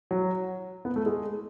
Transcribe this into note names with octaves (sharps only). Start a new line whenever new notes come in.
F#3
B3
A3
G#3